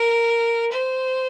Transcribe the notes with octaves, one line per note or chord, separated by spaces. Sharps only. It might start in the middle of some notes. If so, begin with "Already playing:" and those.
Already playing: A#4
C5